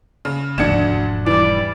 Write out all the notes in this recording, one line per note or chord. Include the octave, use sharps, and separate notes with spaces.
C#3
E1 D2 G#2 F3 D4 G#6 C#7 E7
E3 G3 D5